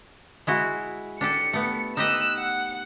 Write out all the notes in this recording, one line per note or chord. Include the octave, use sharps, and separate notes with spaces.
G#3 E4 F#4
D4 G4 A4 C#7
A3 B3
D#4 G4 D#5 E6 F#6
F#5